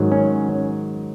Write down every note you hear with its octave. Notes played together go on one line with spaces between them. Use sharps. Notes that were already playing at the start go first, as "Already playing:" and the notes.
Already playing: G#2 D#3 F#3
C#4